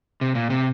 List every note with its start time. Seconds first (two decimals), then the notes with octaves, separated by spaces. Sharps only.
0.21 C3
0.35 A#2
0.50 C3